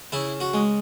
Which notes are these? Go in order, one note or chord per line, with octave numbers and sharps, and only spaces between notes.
C#3 E4
F#4
G#3